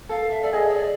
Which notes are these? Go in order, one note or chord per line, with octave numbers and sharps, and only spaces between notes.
A4 F5
E5
A4 D5
G#4 D#5
C#5
D5